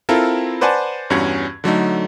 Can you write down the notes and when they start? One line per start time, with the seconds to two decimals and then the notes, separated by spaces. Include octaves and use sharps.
0.09 C4 E4 F4 A4 A#4
0.61 B4 C5 D5 F#5 G#5 A5
1.10 E2 G2 C#4 F#4 F#5 G#6
1.64 D3 F#3 A3 D#4